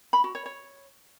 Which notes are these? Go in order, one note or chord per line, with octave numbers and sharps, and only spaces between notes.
B5
F#4
C#5
C#5